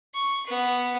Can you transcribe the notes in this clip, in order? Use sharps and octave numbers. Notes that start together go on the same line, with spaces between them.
C#6
B3